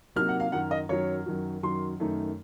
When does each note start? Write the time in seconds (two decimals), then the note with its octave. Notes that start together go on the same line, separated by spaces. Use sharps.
0.16 C3 F#3 A#3 D#4 F6
0.29 F#5
0.40 F5
0.52 F#2 D#3 F#3 F#5
0.71 D#5
0.89 F#2 D#3 F#3 C#5
1.26 F#2 D#3 F#3
1.63 F#2 D#3 F#3 C6
2.00 F#2 D#3 A3 D#4